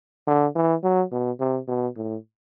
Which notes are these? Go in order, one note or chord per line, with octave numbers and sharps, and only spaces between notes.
D3
E3
F#3
B2
C3
B2
A2